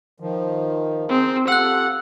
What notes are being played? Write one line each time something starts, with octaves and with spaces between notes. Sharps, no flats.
D#3 F3
C4 G#4 A#4 C5
F4 G4 A4 F#5 E6 F#6